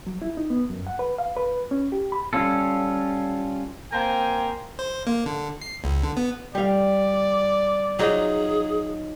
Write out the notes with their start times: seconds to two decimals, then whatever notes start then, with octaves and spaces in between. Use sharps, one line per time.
0.07 F#3
0.22 E4
0.37 D#4
0.50 B3
0.70 F#2
0.87 F#5
0.99 B4
1.18 F5
1.37 B4
1.71 C#4
1.92 G4
2.12 B5
2.33 G3 C#4 F4 A4
3.93 A#3 C4 A#4 C5 G5 G#5
4.79 C5
5.07 A#3
5.26 D3
5.62 C7
5.84 C#2
6.03 D3
6.17 B3
6.55 G3 D5 F5
7.99 F#3 D#4 F4 G#4